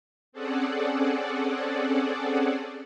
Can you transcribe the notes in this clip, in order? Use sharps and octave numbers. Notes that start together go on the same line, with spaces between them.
C4 C#4 G#4 A4 D5 F#5